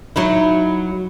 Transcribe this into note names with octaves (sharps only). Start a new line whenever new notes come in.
F#3 D#4 E4